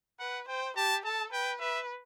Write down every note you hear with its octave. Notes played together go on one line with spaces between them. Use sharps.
B4 F#5
C5 G5
G4 A5
A4 A5
B4 G5
B4 E5